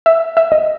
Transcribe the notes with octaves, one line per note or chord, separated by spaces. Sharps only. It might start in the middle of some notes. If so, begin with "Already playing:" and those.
E5
E5
D#5